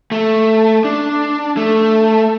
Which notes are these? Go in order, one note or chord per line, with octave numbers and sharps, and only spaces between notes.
A3
D4
A3